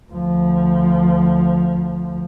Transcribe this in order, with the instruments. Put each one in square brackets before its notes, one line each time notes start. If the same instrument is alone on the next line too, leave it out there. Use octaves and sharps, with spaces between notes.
[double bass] D2 F3